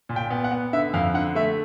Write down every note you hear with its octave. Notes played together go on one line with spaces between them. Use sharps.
A#2
G5
B3
F#5
B3
D3 E5
F2 F5
D3 F#5
A3 E5